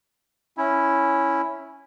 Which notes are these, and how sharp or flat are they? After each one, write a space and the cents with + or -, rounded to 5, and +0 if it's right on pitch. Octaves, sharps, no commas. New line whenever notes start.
C#4 +0 E4 +0